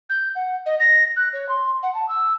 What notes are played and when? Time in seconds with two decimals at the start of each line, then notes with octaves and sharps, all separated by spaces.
0.10 G6
0.35 F#5
0.66 D#5
0.80 A#6
1.16 F#6
1.33 C#5
1.49 C6
1.83 F#5
1.94 A5
2.09 E6